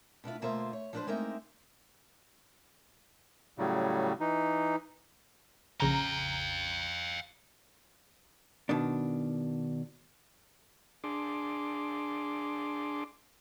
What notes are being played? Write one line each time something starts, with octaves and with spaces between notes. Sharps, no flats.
B2 D4 E4 F4
D2 B2 A#3 F4 C5 E5
C#5
F3 F#3 D4 G4 B4 C5
G#3 A#3 C4 D#4 E5
A2 C#3 F#3 G3
E3 D#4
A#1 C#3 F5 G5 A#5
B2 D#3 D4
D4 G#4 C6 D6